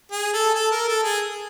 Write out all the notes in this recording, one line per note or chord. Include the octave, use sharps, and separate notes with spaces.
G#4
A4
A4
A#4
A4
G#4